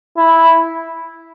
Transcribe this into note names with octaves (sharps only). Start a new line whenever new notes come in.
E4